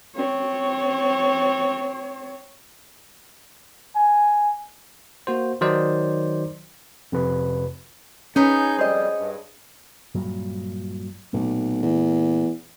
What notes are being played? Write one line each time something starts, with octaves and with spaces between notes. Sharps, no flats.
C4 C#5
G#5
A#3 F#4 C5
D#3 F#3 D#4 C5 D5
F2 C3 B4
C#4 D#4 G#4 B4 C#5 G6
F2 G3 C5 D#5
G2
G2 A#2 F#3
B1 A#2 A3
E2